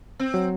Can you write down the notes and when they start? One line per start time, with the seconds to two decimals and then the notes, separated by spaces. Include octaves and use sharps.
0.20 C4
0.34 F#3